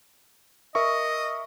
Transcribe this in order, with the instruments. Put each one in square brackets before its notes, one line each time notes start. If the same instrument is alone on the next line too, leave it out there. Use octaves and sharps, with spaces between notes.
[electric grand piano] A#4 E5 C#6 [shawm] D#5